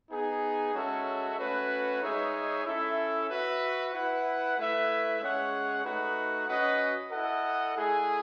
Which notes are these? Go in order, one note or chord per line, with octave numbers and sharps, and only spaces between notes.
B3 D#4 G#4
G#3 C#4 F#4 A4 E5
A3 C#4 F#4 B4
G#3 D#4 G#4 C#5 E5
C#4 E4 A4 E5
F#4 B4 E5
E4 B4 F#5
A3 E4 B4 E5
G#3 C#4 G#4 C#5 F#5
A3 D#4 F#4 B4 F#5
C#4 F#4 B4 D#5 F#5
E4 A4 D#5 F#5
A3 E4 G#4